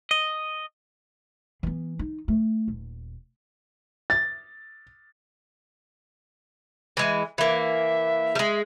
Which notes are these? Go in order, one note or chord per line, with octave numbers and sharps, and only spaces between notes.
D#5
E3 B3
D#4
A3
D#1
A6
E3 G#3
E3 A#3 E5
G3 G#3